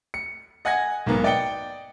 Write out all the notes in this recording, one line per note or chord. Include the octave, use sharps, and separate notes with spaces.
C#7
D#5 F#5 G#5 G#6 A#6
B1 G#2 A#3 B3
D5 D#5 G5 C#7 G7